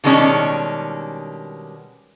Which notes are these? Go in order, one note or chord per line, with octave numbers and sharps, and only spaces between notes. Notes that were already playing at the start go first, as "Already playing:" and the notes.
B2 D#3 G3 G#3 C#4 D4